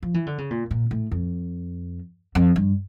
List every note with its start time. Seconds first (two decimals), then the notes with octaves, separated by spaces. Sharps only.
0.03 F3
0.14 E3
0.26 D3
0.38 C#3
0.51 A#2
0.71 A#2
0.91 A2
1.11 F2
2.35 F2
2.56 G2